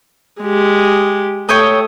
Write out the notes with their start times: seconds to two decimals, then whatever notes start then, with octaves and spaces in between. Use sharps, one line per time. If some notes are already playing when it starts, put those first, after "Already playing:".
0.42 G#3 G4
1.49 A3 C#5 G5 D#6